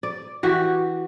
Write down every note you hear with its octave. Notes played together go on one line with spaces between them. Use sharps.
D5
E3 F#4 G4